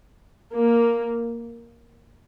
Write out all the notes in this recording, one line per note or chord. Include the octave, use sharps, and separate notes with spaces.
A#3